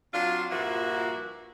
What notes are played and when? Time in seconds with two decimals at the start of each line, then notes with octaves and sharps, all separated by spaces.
0.14 F#3 C4 D4 F4
0.51 G2 A#2 F3 A#3 E4 F#4